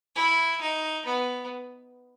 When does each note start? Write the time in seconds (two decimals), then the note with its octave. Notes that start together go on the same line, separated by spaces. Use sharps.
0.15 E4
0.61 D#4
1.05 B3